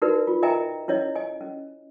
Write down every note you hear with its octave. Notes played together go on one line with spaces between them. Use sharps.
D#4 E4 F#4 A#4 B4 D5
F4
A#4 D#5 E5 G5 G#5 A#5
C#4 E4 C#5 D#5
D#5 G#5
C#4